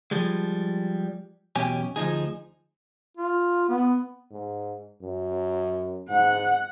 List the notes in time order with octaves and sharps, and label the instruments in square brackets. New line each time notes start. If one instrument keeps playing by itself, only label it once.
[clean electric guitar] F3 G3 G#3
B1 E2 B2 C#4 G4 G#5
D2 F3 D#4 G#4
[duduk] F4
B3
[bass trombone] G#2
F#2
[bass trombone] G#2 [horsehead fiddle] F#5